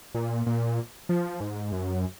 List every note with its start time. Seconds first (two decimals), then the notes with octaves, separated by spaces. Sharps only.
0.15 A#2
0.46 A#2
1.09 F3
1.41 G#2
1.72 F#2